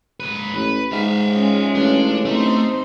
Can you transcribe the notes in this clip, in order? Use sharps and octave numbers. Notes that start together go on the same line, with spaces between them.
G#2 B4
A1 B4
G#2 E5 F5
G#3 C#4 F4
A1 D4
A3 C4 D#4 C5